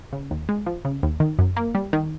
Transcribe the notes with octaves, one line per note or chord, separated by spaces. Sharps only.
C#3
D#2
G#3
F3
C#3
D#2
D#3
F#2
A#3
G3
D#3